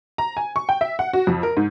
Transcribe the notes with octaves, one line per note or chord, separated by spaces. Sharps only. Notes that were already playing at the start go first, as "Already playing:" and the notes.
A#5
G#5
C#6
G5
E5
F#5
F#4
F2
A#4
G#2